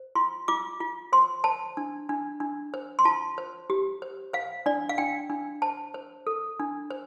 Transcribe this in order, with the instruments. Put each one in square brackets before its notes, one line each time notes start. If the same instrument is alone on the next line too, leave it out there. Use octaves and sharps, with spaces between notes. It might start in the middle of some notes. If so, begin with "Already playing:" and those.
Already playing: [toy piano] C5
F4 C6
F4 D6
F4
C5 C6
C5 A5
D4
D4
D4
C5
C6
F4 A5
C5
G4
C5
C5 F5
D4 D5
F5
D4 G5
D4
C5 A5
C5
A4
D4
C5